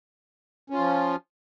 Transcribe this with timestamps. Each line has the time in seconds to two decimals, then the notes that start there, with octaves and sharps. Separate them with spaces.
0.70 C#4
0.74 F4
0.78 F3